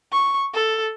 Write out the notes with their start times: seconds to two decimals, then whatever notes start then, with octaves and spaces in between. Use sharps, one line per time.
0.12 C#6
0.54 A4